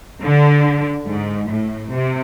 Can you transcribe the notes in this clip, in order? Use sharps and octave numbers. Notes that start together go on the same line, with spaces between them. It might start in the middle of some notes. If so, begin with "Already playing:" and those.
D3
G#2
A2
C3